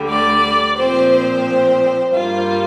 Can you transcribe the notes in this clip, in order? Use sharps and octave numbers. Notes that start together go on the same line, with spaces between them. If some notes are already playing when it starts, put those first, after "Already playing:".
Already playing: D2 D3 G3
D5
A#2 F3 C4 C5
C5
G2 G3 A#3 F4